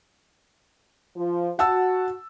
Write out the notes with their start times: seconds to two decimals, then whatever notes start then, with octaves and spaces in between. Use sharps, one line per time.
1.16 F3 F4
1.59 F#4 F#5 A5 E6